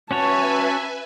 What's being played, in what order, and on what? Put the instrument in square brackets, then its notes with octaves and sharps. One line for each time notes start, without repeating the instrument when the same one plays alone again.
[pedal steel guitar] C#4 F#4 C#5 [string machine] B4 E5 G#5 [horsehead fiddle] A5